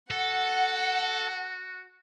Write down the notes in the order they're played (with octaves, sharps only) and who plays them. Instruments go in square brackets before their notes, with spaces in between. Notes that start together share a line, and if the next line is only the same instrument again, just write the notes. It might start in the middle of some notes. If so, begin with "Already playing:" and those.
[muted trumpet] F#4 [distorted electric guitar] A4 [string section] F#5